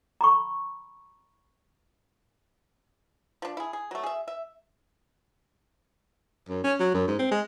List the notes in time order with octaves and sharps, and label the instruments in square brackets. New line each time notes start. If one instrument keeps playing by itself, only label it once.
[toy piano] A#5 B5 C#6
[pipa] F3 D4
E4 G#4
G#4
F#3 A3
G#4 E5
E5
[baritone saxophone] F#2
C#4
F#3
F#2
G#2
C4
G#3